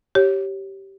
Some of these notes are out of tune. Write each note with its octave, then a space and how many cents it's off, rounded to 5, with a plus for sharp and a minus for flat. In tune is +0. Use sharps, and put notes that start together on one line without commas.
G4 -15 C#5 -15